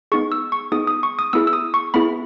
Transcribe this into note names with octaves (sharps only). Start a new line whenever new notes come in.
B3 D#4 G#4 C#6
E6
C#6
B3 D#4 G#4 D#6
D#6
C#6
D#6
B3 E4 G#4 E6
E6
D#6
C#6
B3 E4 G#4 B5